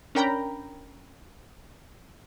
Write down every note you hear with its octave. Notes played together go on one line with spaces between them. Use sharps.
C#4 D4 A#4 G5 A#5 B5